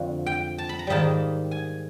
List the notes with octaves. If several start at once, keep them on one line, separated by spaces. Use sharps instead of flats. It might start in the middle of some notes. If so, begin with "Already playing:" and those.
Already playing: F2 D3 F3 A3 F#5
G5
A5
B5
A#5
G#2 D#3 G3 A#3 A5
G#5